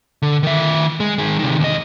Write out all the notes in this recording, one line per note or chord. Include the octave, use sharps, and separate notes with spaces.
D3
D#3 E5
G#3
D#3 G#3
C3 D#3
D#2 D#5